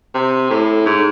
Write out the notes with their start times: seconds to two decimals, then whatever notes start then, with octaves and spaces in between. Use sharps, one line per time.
0.14 C3
0.50 A2
0.86 G#2